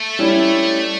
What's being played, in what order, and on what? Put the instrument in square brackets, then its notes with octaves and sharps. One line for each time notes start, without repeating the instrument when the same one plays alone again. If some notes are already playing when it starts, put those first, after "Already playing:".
Already playing: [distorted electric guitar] A3
[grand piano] G3 C#4 E4